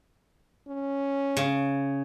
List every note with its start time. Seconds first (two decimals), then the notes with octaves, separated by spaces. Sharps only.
0.68 C#4
1.37 C#3